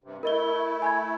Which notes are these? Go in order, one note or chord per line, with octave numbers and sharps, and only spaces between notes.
G2 C3
A3 E4 A#4 D#5 G7
G#5 B5 G#6